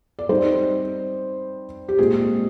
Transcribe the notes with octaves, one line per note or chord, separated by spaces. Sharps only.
D5
G3 C4 D#4 C5
G4
A#2 G#3 C4 F4 G#4